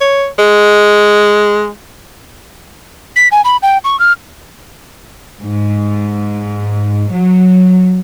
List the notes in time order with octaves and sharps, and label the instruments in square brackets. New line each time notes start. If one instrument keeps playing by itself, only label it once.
[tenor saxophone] C#5
G#3
[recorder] B6
G#5
B5
G5
C#6
F6
[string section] G#2
F#3